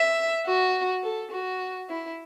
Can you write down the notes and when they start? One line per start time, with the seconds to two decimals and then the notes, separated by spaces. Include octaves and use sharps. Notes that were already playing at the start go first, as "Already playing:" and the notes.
Already playing: E5
0.46 F#4
1.03 A4
1.32 F#4
1.89 E4